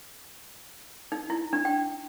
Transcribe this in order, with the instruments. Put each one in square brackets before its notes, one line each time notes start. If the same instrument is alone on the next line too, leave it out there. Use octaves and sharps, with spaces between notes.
[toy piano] D#4
E4
D4
G5